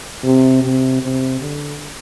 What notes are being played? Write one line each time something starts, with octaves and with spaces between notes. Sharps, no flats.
C3
C3
C3
D3